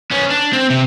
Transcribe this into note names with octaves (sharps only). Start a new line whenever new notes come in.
B3 C#4
D4
C4
C3